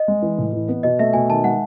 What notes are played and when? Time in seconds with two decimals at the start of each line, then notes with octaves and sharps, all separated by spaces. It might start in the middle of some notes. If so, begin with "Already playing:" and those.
Already playing: D#5
0.08 G#3
0.22 E3
0.39 A2
0.53 E3
0.69 B3
0.83 B2 D#5
0.99 A3 E5
1.13 B2 G#5
1.30 D#3 A5
1.44 G#3 F#5